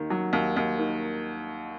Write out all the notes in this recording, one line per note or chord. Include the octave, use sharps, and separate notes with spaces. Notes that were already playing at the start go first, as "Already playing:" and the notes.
Already playing: D#2 D#3
F#3
D#2
D#2
D#3